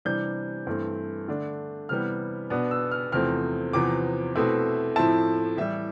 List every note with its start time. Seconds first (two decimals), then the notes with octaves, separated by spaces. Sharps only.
0.05 C3 E3 G3 D4 G6
0.67 G2 E3 A3 C4
1.28 D3 A3 D4
1.89 C3 E3 G3 B3 F6
2.50 B2 B3 D4
2.71 E6
2.91 F6
3.12 E2 C3 F3 A3 C4 F6
3.73 E2 C3 F3 B3 D6
4.35 B2 A3 C4 E4
4.96 A2 F3 A3 C4 E4 A5
5.57 A2 E3 G3 E5